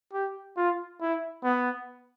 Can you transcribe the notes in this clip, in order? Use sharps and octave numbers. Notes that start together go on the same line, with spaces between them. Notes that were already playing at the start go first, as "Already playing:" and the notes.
G4
F4
E4
B3